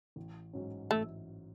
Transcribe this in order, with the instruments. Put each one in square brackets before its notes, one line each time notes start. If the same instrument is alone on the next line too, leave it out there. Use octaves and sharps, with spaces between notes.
[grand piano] A1
G#2 F#3 C#4
[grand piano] A1 [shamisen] A3